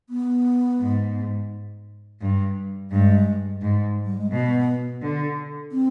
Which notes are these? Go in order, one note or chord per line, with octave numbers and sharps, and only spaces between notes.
B3
G#2
G2
G2 G#3
G#2
G3
G#3
B2 B3
D3
C4